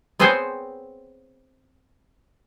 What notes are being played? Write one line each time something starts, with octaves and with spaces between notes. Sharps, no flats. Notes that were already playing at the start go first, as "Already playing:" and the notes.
B3 C4 G#4 C5 C#5 G5